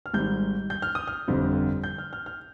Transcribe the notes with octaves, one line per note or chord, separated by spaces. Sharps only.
F6
G#1 G#2 G3 G6
G6
F6
D#6
F6
G1 F2 D3 G3 C4
G6
F6
F6
F6